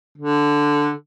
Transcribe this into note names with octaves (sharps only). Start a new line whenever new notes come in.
D3